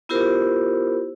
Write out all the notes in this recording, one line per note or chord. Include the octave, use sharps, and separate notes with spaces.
B3 E4 F4 G4 A#4 C5